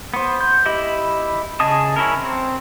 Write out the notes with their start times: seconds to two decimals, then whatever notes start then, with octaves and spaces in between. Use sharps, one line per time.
0.14 B3 C5
0.41 G6
0.66 E4 G4 D#5 B5
1.60 C#3 G#4 D#5 A5 D#6
1.96 C#4 E4 A#4
2.19 C4